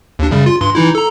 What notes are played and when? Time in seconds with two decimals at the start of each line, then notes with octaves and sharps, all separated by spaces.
0.19 D#2 D4
0.31 F#2 C#3 G3
0.46 F4
0.61 G2 C6
0.75 E3 D#4 E4
0.95 A4 A#5